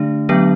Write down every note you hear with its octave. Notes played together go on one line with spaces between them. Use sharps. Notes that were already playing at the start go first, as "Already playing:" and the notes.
Already playing: D3 A3 D4
D3 F#3 B3 D4